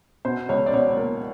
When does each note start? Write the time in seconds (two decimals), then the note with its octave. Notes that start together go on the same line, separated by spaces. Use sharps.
0.25 B2 C5
0.49 C#2 C#5
0.66 D5
0.73 B2 C#5
0.97 A#3